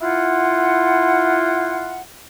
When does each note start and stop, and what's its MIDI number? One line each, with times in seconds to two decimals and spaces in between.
0.02 2.01 64
0.02 2.01 65
0.02 2.01 78